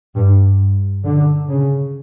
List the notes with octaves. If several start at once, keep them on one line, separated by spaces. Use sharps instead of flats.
G2
D3
C#3